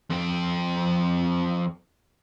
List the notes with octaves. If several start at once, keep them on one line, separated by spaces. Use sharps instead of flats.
F2 C4